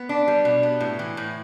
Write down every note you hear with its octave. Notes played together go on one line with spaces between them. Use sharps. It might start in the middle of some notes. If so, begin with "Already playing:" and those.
Already playing: B3
D4
G3
B2
B3
A2
E3
A2